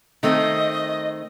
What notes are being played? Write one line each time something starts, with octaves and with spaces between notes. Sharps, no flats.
D#3 A3 C4 D#5